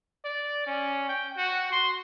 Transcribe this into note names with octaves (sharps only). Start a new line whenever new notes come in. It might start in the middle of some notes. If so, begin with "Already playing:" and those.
D5
C#4
G5
F#4
C6